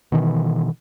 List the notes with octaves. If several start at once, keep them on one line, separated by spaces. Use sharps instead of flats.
B2 D#3 E3